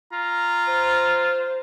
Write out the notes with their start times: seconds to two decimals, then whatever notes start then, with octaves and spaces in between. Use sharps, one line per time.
0.13 F4 A#5
0.68 C5